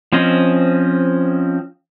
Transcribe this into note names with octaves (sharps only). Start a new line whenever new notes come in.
F3 C4 C#4 D#5